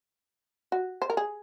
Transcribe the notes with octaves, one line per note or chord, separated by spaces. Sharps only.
F#4
C5
A#4
G#4